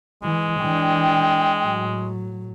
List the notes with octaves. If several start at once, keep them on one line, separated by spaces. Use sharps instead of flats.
E3 G#3
E3 D4 G5
A2 F#3